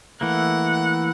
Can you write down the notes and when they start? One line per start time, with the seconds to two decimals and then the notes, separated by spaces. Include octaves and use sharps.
0.21 E3 A3 A#3 F#5